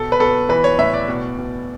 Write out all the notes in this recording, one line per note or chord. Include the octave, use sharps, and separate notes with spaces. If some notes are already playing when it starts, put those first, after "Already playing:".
Already playing: B2 A4
B4
B2 A4
E3 B4
C#5
A2 E5
D5
B2
B2